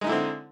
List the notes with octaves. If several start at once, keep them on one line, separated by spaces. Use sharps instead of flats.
D3 G#3 C4 D#4 E4